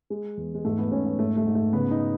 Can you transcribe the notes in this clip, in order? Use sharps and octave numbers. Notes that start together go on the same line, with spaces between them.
G#3
E2
G#3
G#2 A3
B3
G#2 C#4
B3
G#2 A3
A3
G#2
A3
C#3 B3
D#4